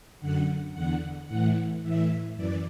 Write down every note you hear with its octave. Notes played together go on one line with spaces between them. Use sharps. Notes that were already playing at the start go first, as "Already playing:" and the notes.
F#2 D3 F#5
E2 D3 F#5
A2 E3 F#5
A2 E3 E5
F#2 E3 D5